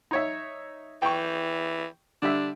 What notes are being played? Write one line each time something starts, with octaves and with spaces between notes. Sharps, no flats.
D#4 C#5 E5
E3 G5 C#6
D3 G3 D4 E5